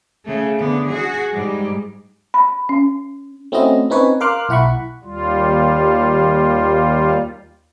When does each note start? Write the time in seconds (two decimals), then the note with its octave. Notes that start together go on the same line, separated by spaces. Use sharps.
0.25 C#3 A3
0.59 D3 B3
0.89 F#4 G#4
1.33 G#2 G3
2.34 B5
2.69 C#4
3.52 A3 C4 C#4 E4 F#4 D#5
3.90 C4 C#4 D#4 B4 C#5
4.20 A#4 F5 C6 D6 F6 F#6
4.49 B1 E4 F#5 B5 C#6
5.04 D#2 G3 F4